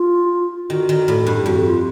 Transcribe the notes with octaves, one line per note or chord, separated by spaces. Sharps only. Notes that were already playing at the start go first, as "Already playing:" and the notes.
Already playing: F4
D#3 F#4
D#3
A2
G2
F2 F#4
F4